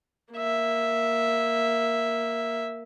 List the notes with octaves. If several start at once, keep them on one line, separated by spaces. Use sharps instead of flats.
A#3 E5